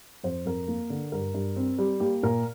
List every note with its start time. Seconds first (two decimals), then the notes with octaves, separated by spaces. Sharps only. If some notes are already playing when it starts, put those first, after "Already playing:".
0.24 F2 C5
0.46 F2 A#4
0.68 A#3
0.90 D3
1.12 G2 A#4
1.34 G2
1.56 C4
1.79 G3
2.00 A#3 G4
2.23 A#2 A#4